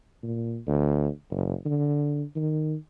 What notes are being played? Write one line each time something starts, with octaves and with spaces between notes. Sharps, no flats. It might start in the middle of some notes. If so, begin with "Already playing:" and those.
A#2
D2
F#1
D3
D#3